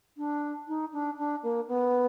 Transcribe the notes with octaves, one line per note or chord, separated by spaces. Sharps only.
D4
D#4
D4
D4
A#3
B3